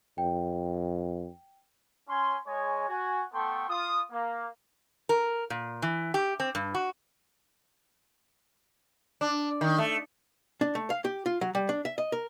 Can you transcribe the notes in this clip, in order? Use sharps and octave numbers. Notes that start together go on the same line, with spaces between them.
F2 G5
C#4 G#5 C6
G#3 C#5 G#5
F#4 G#5
A3 B3 A4 G5 C6 C#6
F4 D#6
A#3
A#4
A#2
E3
G4
C4
G2
F#4
D4
D#3
A3
D4
A3
F5
G4
F4
F#3
G3
D4
E5
D#5
A#4